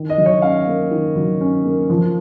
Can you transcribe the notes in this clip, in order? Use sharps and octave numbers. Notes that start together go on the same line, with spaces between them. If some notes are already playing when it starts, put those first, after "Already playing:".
Already playing: D#3
D#5
F#3
C#5
C#4 F5
A#3
D#3
F#3
C#4
A#3
F3